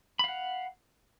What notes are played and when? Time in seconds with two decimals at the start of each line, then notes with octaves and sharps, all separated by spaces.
0.19 B5
0.24 F5
0.28 F#5